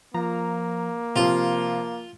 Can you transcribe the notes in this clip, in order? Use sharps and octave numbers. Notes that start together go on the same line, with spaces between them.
F3 A#3 A#5
C3 F3 F4 F5